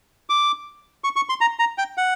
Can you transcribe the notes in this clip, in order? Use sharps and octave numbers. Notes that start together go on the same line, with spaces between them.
D6
C#6
C#6
C6
A#5
A#5
G5
F#5